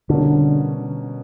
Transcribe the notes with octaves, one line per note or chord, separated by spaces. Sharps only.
B2 D3 G3 A#3 C#4